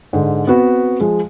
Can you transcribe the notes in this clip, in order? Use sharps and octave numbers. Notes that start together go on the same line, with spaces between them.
G#2 D3
B3 C4 F#4 B4
F3 G#3